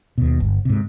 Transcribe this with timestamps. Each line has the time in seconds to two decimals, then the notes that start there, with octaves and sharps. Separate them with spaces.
0.18 D#2 B2
0.40 G1
0.65 G#2 C3